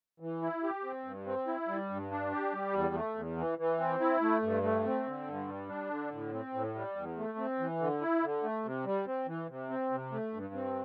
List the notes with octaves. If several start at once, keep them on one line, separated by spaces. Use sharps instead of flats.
E3
E4
G4
C4
G2
C4
E4
G3
G2
D4
G4
G3
E2
A3
E2
E3
E3
C4
E4
A3
G2
A3
C4
D3
G2
G3
D4
D3
A2
C4
A2
G3
E2
A3
C4
E3
D3
E4
D3
A3
C3
G3
C4
E3
C3
C4
C3
A3
G2
C4